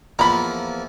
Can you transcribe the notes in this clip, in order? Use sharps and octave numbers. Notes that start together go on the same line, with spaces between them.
E2 F3 A#3 A#5 B5